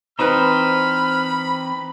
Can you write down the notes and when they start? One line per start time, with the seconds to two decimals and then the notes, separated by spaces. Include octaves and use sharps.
0.19 E3 C4 D#4 B4 C5 B5 F6